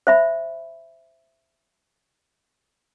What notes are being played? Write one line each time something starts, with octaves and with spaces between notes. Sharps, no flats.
C5 E5 B5